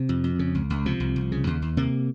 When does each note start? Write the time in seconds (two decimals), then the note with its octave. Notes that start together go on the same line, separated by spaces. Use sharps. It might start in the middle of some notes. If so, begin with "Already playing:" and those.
Already playing: C3
0.09 F2
0.24 F2
0.39 C#3
0.55 C#2
0.70 C#2
0.86 C3 F3
1.00 C2
1.16 C2
1.32 C#3
1.47 D#2
1.62 D#2
1.77 C3 A#3